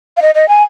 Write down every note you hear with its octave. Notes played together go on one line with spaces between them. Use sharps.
F5
D#5
D#5
G#5